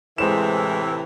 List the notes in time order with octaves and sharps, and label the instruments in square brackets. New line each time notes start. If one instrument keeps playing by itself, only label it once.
[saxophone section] A2 C3 E3 [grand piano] G#3 C5 E7